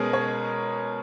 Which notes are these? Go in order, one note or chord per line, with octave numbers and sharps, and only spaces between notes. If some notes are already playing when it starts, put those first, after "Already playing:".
Already playing: B2 G#3 C#4 G#4 A#4 B4
C#5